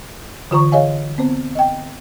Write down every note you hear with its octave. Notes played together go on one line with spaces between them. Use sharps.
D3 E3 F4 C5 A#5 C#6
G#4 C#5 D#5 F5 G#5
B3 C4 C5
D#5 G5